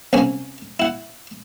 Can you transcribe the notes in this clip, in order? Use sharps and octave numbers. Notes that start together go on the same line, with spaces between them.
C2 C#3 C#4 G#5
E4 F#5